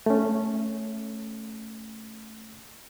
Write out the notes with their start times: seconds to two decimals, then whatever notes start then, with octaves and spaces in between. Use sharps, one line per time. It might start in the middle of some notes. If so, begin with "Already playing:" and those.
0.06 A3 C#4